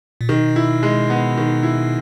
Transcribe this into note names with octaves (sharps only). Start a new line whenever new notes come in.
A#2
B2 D#3
E4
G#3
B3
D#3
E4